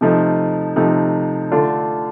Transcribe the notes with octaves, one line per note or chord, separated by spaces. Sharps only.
C3 F3 A3 D#4
C3 F3 A3 D#4
D3 A3 D4 F4